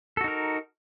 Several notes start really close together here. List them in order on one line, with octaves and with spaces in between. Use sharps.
A4 F#4 D#4 A#4